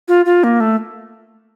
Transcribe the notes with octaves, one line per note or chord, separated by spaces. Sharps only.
F4
F4
A#3
A3